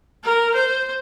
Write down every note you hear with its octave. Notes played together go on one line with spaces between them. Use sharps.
A#4
C5